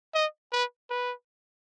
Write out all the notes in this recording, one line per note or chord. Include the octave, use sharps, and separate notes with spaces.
D#5
B4
B4